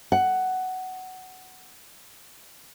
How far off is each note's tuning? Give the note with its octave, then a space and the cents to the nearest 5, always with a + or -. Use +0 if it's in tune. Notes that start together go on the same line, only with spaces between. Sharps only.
F#5 +10